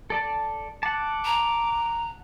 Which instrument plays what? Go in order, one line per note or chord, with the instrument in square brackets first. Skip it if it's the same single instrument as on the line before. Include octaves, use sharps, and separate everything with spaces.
[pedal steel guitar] A4 D5 A5
[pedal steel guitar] F#5 A5 [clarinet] D6
[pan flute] A#5